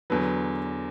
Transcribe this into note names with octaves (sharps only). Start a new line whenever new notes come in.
E2 D3 F#3 B4